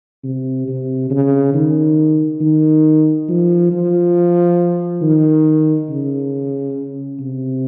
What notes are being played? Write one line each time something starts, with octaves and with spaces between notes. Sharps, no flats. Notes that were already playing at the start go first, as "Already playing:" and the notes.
C3
C3
C#3
D#3
D#3
F3
F3
D#3
C#3
C3